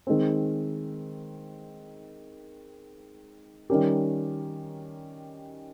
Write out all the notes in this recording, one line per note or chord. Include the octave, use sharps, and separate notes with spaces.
D#3 G#3 C4
D#3 G3 C#4 G4 A#4